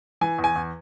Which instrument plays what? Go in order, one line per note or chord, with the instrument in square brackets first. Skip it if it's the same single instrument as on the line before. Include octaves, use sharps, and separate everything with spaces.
[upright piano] E3 G#5
E2
G#5
E2